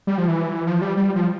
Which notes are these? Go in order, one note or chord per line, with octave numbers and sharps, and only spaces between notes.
G3
F3
E3
F3
G3
G3
F3